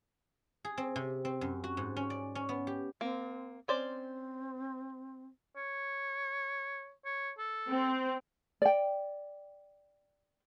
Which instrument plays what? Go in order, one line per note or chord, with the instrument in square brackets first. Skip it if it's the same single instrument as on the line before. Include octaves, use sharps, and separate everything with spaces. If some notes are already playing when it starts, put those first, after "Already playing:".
[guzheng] G#4
C4
C3
C4
F#2
F#4
G#2
C#4
D5
C#4
B3
G4
[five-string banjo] A#3 [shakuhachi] C4
[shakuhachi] C4 [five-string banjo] C#4 C5 D5
[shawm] C#5
C#5
A4
[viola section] C4
[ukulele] D5 G5